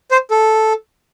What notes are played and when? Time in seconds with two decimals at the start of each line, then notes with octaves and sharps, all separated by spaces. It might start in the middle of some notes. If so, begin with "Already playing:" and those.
0.11 C5
0.31 A4